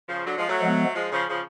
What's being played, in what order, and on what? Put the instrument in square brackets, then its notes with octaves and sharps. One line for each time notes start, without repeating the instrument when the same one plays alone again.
[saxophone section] C#3 F3
D3 F#3
F3 G#3
F#3 A3
[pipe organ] F3 G#3 B3
[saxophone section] F3 G#3
C#3 F3
C#3 F3